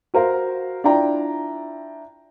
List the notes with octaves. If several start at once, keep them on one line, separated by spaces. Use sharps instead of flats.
F#4 A#4 C5 F5
D4 E4 F4 D5 G5 A#5